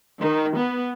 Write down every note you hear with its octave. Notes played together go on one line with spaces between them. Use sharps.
D#3
B3